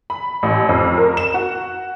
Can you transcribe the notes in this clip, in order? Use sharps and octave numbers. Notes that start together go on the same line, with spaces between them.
B5
A1
F2
A#4
E7
F#4